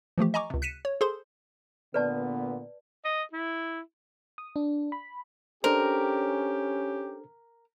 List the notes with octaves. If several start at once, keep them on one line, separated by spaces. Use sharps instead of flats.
E3 F3 A3 G4
D#5 G#5 A#5 C#6 D6
C#2 C3
F#6 B6 C#7 D#7 E7
C#5
G#4 A4 C5 C6
A#2 D3 B3 B4 D5 A5
D#5
E4
D#6
D4
B5
C#4 D4 G4 A4 A#4 C5